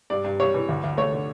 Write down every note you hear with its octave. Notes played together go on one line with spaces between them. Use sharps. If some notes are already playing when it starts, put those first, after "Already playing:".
G2 D5
G2
G3 C#5
E3
D2
D2
A3 C#5
D3